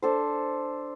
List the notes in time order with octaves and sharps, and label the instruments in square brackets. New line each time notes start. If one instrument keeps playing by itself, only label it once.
[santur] D4 A4 C5